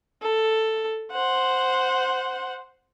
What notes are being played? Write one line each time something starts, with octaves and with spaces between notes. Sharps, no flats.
A4
C5 F#5